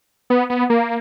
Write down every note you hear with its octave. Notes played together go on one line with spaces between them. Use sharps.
B3
B3
A#3